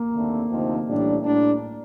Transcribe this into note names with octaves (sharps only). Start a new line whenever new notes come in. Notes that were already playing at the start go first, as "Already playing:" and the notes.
Already playing: A#3
D#2 D3 A3 C4
D2 C3 F3 C4 D#4
A1 A2 G3 D4
A2 G3 D4